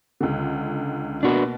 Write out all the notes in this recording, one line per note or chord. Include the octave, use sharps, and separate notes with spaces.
C#2 D3
B2 A#3 D4 F#4 B4